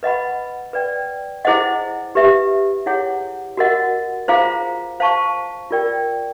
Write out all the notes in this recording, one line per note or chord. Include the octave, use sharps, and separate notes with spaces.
B4 D#5 F#5 B5
B4 D5 G5
E4 G#4 C5 D#5 F#5
G4 B4 E5
E4 G#4 C#5 F#5
F#4 A#4 D#5 F#5
F4 G#4 C5 F5 A#5
C5 F5 A5 C#6
F4 A#4 D5 G5